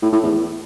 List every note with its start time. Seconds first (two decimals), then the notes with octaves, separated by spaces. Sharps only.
0.02 A2
0.12 A2
0.23 E2